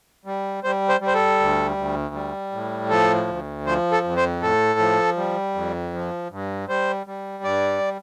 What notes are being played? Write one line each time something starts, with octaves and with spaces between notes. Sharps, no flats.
G3
G3 C5
C5
G3
C5
A4
D2
D2
G3
A2
F3 A4
D2
F3 C5
A4
F2
C5
A2 A4
F3
G3
F2
F3
G2
G3 C5
G3
G2 D5